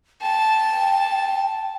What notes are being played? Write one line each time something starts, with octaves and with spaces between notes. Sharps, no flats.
G5 A5